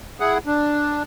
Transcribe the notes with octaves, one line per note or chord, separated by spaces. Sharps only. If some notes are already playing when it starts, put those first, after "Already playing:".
E4 G#4 F#5
D4